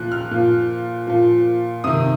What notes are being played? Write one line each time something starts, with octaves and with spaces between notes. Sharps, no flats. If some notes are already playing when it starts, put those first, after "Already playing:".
Already playing: A#2 F3 F#6
F6
A#2 F3
A#2 F3
C3 D#3 D#6